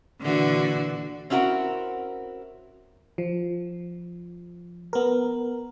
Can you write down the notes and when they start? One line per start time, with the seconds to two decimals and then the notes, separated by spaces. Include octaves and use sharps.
0.22 A#2 D3 E3 F#4
1.30 C4 C#4 E4 F#4 A#4
3.18 F3
4.93 B3 A#4